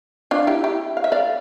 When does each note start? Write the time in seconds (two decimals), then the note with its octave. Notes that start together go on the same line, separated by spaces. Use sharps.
0.31 D4 F4
0.47 E4 G4
0.64 E4 G4
0.97 F5
1.04 E5
1.12 D5 F5